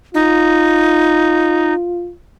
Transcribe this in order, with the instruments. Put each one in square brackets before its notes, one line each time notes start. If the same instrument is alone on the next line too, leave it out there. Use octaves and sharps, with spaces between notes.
[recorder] D#4 [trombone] F4